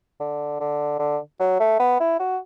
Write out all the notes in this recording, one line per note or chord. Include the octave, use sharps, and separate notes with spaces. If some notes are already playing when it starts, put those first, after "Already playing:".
D3
D3
D3
F#3
A3
B3
E4
F#4